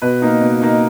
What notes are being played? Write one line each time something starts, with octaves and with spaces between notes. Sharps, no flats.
B2 B4
A#3 D#4
B2
A#3 D#4